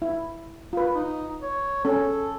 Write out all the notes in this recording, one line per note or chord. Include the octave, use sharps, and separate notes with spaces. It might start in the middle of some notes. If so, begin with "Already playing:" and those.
E4
F4 B4
D#4
C#5
C#4 A4